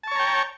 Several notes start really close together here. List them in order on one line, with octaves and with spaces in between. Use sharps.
A5 C#6 C#5 A#5 G5